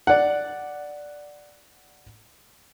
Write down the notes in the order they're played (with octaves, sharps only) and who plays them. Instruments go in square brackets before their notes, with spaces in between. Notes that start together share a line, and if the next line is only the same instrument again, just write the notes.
[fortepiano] D5 F#5